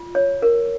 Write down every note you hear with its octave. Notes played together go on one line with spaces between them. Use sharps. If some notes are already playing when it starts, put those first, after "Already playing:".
Already playing: F4
C#5
A#4